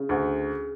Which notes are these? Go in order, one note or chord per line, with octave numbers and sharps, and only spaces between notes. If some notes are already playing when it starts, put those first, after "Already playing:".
Already playing: C#3
D2